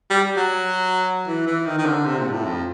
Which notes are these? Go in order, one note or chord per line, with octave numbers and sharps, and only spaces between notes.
G3
F#3
E3
E3
D#3
D#3
D3
C3
A#2
G#2
A2
F2